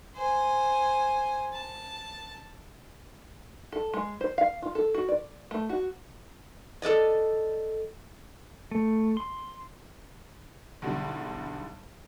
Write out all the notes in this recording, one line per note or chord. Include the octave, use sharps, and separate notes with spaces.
C5 G#5
A5
A4
G#3
C5
F5
F4
A4
F#4
D5
A3
F#4
A4 B4 D5 D#5
A3
C6
B1 E2 D3 G3